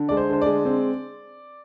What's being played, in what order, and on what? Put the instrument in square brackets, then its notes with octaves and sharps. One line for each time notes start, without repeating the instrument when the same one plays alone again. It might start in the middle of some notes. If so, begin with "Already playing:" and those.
Already playing: [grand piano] D3
G#3 D5
C5
D3 C5
G#3 D5
C4